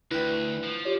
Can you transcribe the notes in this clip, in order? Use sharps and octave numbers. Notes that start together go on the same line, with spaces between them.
D2 E4 B4 G5
F3
F4 G4 C#5